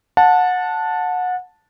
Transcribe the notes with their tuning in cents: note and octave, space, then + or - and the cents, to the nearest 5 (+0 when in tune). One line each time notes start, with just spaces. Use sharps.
F#5 -25 A5 +0